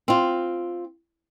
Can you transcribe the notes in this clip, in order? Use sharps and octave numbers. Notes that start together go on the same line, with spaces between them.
C4 F4